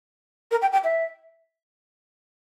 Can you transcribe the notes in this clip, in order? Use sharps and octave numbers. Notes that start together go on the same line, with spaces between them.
A#4
G5
G5
E5